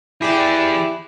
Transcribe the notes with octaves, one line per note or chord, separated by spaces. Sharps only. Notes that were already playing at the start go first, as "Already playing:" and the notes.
E3 E4 G4 G#4 D5